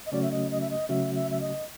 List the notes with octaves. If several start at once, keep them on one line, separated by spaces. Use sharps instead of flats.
D#5
C#3 F#3 A3 C#4 F#4 D5
E5
D#5
D#5
E5
D#5
C#3 F#3 A3 C#4 F#4 E5
E5
E5
D#5